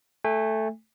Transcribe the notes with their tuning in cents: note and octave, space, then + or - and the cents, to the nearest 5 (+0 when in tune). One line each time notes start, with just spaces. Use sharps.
A3 +0 G#5 -35